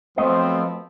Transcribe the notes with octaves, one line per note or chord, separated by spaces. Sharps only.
F3 F#3 A3 B3 C4 D#5